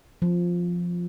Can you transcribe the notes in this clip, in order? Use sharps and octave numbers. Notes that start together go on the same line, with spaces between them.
F3